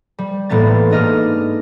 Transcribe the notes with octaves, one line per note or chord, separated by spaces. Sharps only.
G3
A1 A2 A#3 B3 A6
G#2 D4 D#5 F6